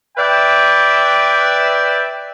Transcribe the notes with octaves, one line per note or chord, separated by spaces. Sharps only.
B4 D5 E5 G5